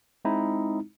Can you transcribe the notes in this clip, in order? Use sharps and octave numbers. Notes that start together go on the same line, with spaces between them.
G#3 C4 D#4 E4